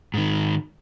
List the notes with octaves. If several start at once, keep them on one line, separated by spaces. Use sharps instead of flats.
G#2 D#3